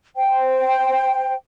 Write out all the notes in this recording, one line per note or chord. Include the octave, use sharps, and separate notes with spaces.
C5 G5